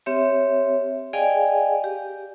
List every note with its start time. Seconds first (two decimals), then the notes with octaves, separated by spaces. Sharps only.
0.06 C4 G4 C#5 E5
1.13 G#4 D5 D#5 F5 G5 G#5
1.84 G4